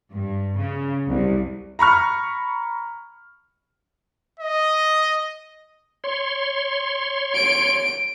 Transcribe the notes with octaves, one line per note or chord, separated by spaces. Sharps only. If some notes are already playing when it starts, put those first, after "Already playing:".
G2
C#3
C2
A#5 B5 C#6 F6
D#5
C#5 C6
D7